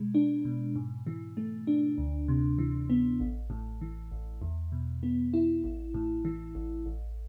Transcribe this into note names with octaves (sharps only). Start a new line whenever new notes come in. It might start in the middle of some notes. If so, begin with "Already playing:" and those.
Already playing: B2 G#3
D4
B2
G#2
E3
A3
D4
D2
C3
E3
B3
A1
A2
E3
A1
E2
B2
B3
E4
A1
A2
E3
A1
A1